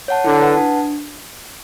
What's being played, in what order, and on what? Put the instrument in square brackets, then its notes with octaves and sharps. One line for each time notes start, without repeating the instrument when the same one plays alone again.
[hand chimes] C#5 F#5 A5
[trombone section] D3 [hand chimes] E4
[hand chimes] B4 F#5 A5
D4